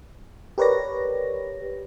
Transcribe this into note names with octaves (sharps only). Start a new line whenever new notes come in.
G4 A#4 B4 C#5 D5 A#6